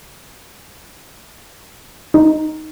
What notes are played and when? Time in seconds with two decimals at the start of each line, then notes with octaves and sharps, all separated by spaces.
2.14 D#4